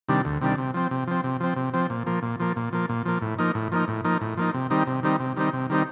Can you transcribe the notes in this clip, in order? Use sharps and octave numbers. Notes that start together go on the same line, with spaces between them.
C3 D#3 G3 D4
D2
C3 D#3 G3 D4
C3
F3 C4
C3
F3 C4
C3
F3 C4
C3
F3 C4
A#2
F3 A#3
A#2
F3 A#3
A#2
F3 A#3
A#2
F3 A#3
A2
F3 A#3 D#4
A2
F3 A#3 D#4
A2
F3 A#3 D#4
A2
F3 A#3 D#4
C3
D#3 G3 C4 D#4
C3
D#3 G3 C4 D#4
C3
D#3 G3 C4 D#4
C3
D#3 G3 C4 D#4